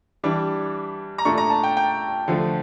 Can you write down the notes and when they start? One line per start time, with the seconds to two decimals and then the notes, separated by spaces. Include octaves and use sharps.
0.24 E3 G3 D4 D6
1.18 A#5
1.25 A#2 A3 D4 C#6
1.38 A#5
1.50 A5
1.63 G5
1.77 G5
2.28 D3 F3 A3